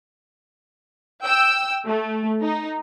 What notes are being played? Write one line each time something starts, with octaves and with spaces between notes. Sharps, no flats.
G5 E6
A3
D#4